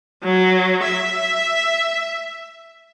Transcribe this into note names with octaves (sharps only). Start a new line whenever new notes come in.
F#3
E5